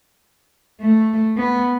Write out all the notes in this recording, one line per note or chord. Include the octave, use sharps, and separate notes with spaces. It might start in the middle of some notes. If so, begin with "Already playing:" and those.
A3
B3